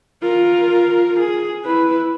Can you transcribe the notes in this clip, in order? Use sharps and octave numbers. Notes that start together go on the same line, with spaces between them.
F4 A#4
G#4
E4 B4